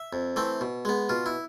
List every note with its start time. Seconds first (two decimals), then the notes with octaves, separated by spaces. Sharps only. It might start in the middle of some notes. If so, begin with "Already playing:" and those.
Already playing: E5
0.13 F2
0.36 E3 A3 C4
0.61 B2
0.85 G#3 B3
1.09 B2 F4
1.26 E4